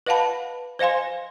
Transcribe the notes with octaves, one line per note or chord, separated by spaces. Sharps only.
B4 D#5 F5 F#5 A5 B5
C5 D#5 F5 G#5 C6